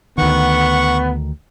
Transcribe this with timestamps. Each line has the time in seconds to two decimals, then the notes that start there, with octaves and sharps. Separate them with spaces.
0.18 D2 D#3 B3 F#5 C#6